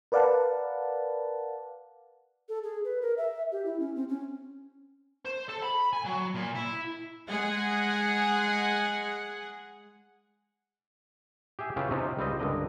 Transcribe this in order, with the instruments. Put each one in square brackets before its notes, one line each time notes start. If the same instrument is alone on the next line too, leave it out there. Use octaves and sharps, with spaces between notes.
[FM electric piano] A#4 B4 D5 F5 F#5 A5
[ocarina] A4
G#4
B4
A#4
E5
G4
E4
C#4
C4
C#4
[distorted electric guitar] C5
A4
B5
G#5
F#3
A#2
E4
[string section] G#3 G#4 F#5
[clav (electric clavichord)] G4 G#4 E5 G#5
C#3 E4 F4 G4 B4
C3 C4 C#4 D#4 F4
C#2 G3 C4 D#5
C#2 G2 D3 A#4 D#5